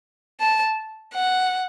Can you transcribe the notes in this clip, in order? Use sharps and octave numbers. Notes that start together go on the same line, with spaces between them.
A5
F#5